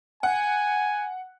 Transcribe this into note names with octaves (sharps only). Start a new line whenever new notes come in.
F#5 G#5